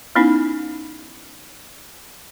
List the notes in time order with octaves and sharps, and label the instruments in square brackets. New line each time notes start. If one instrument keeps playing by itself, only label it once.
[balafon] B3 C#4 D#4 E4